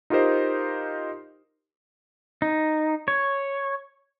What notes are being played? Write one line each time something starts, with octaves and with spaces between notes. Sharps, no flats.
D#4 F4 G4 A#4 C5 D#5
D#4
C#5